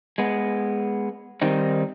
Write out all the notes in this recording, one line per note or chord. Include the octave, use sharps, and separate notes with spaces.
G#3 B3
D#3 G3 C4 D#4